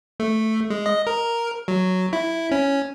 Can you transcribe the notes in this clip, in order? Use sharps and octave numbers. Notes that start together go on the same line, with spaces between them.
A3
G#3
D#5
A#4
F#3
E4
C#4